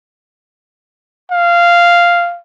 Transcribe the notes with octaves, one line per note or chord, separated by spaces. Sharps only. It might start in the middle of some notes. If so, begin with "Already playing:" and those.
F5